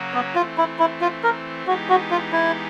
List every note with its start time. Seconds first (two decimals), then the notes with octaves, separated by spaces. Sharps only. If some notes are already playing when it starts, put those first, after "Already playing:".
Already playing: C#3 F#3 A#3 C#4 F#4
0.14 B3
0.35 E3 A3 C4 F4
0.58 E4
0.79 E4
1.01 F4
1.23 A#4
1.67 E3 G#3 B3 D#4 F#4 G4
1.89 F#4
2.11 F4
2.32 E4